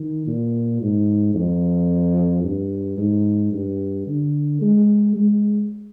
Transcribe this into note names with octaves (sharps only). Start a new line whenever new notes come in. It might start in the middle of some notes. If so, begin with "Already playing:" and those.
Already playing: D#3
A#2
G#2
F2
G2
G#2
G2
D3
G#3
G#3